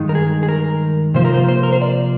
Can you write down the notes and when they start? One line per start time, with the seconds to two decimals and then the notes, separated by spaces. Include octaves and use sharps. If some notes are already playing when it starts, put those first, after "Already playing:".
Already playing: G2 D#3 G#3 D#4
0.09 A#4
0.15 G#4
0.43 G#4
0.49 A#4
1.14 C3 F3 A#3 F4 C5
1.25 A#4
1.34 C5
1.49 C5
1.63 A#4
1.73 C5
1.82 D5